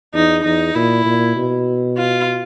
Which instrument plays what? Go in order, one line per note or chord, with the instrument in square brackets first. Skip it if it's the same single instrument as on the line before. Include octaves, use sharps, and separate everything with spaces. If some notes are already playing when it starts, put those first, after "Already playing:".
[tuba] E2 [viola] D#4
[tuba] E2 [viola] D#4
[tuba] A#2 [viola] E4
[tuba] A#2
B2
[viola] F4